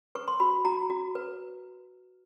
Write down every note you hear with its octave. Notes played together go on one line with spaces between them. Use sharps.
B4 C#6
C6
F#4 B5
F#4 A#5
F#4
B4